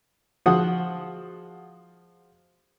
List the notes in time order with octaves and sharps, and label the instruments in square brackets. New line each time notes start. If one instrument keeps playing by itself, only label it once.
[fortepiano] F3 G#3 F#4 F#5 D#6